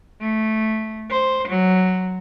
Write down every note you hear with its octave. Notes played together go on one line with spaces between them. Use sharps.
A3
C5
F#3